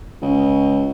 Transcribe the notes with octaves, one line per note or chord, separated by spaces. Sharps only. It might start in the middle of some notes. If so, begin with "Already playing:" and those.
C#2